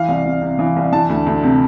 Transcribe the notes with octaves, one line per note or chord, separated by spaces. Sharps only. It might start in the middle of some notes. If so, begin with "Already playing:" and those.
Already playing: E3 F5
C2
C2
C3
E3
C2
E3 A5
D2
D2
C3